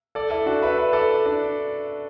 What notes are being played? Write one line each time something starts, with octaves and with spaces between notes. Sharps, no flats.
A4 D5
E4 A4
D4 F#4
B4 E5
B4 E5
A4 D5
D4